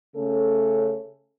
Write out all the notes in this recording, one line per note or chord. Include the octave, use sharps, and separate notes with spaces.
C#3 A3 C#4 A4